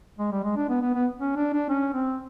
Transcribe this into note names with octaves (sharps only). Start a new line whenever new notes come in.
G#3
G3
G#3
D4
B3
B3
B3
C#4
D4
D4
C#4
C4